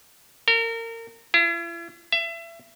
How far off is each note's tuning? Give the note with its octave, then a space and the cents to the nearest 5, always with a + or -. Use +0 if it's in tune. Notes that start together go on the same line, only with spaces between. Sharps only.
A#4 -30
E4 +45
E5 +30